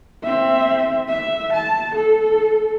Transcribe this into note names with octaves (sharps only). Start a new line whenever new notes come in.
C4 E5
E5
A5
A4